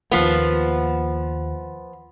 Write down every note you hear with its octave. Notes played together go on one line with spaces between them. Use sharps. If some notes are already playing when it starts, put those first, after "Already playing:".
D#2 F3 A#3 B3